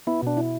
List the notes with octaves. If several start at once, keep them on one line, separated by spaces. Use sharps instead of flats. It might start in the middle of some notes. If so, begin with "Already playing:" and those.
B3 E4
B2 D4
E4